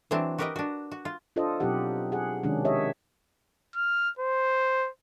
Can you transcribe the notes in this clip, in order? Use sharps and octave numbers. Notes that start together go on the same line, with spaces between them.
E3 F#3 C4 D4
F#4 G4 A#4 B4 D#5 G5
D4 F#4
F#4
F4
D4 F4 A4 C5 D#5
B2 F#3 C4 D#4 G4 F#5
G#4 F#5
C3 D#3 G#3 C#4 D4
G4 C#5 D#5 E5
F6
C5